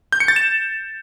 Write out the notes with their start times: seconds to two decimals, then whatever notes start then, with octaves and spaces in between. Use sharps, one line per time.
0.12 G6
0.20 C#7
0.28 A6
0.36 E7